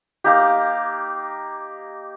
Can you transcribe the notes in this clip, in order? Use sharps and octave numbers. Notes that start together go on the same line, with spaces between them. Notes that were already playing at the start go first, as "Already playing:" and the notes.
A#3 D#4 G4